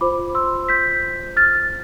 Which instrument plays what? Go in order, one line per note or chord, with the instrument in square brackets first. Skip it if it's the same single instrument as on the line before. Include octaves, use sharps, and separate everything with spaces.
[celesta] F4 C5 B5 D6
C6 E6
G6 B6
F6 A6